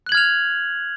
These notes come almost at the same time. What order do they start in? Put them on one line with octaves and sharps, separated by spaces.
F#6 F#7 G#6 F6 F7